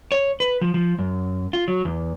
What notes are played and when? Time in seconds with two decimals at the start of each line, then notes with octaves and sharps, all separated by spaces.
0.12 C#5
0.40 B4
0.61 F3
0.74 F3
0.99 F#2
1.53 F4
1.68 F#3
1.85 E2